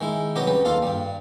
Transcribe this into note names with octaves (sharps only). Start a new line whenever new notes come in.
D#3 G#3 E4
C2 F#3 G4 B4 D#5
C#2 G3 B4
D#2 F4 A4 F5
G2 G3